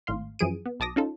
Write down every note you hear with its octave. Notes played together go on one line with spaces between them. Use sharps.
G#1 A2 F5 C6
F#2 E3 F3 G#4 D7 D#7
B3
B1 A5 D6 D#6 A#6
C#4 D#4 F4 A4